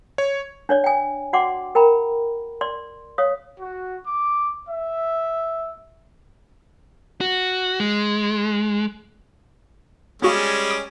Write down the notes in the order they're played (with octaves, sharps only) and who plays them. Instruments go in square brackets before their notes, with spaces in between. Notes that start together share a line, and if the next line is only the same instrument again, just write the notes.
[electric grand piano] C#5
[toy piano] D4 C#5 D5
G5 G#5
F#4 D5 F#5 G5 C6 D6
A#4 G5 A#5 B5
D5 C6
C#5 F5 D#6
[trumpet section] F#4
D6
E5
[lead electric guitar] F#4
G#3
[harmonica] G3 G#3 C#4 [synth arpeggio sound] B3 F#4 F5
[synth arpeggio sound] D#6 D7